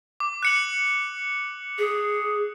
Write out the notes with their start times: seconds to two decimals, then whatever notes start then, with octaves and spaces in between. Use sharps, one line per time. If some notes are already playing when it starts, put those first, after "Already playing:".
0.20 D6
0.43 F#6 C#7 F#7
1.78 G#4